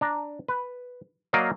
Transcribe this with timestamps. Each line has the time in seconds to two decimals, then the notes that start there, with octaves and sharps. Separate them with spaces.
0.01 D4 A#5
0.48 B4
1.33 F#3 A#3 D5 D#5 F5